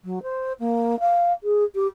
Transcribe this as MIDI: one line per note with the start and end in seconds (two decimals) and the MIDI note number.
0.04 0.22 54
0.22 0.52 72
0.59 0.98 58
1.00 1.33 77
1.43 1.64 68
1.75 1.87 67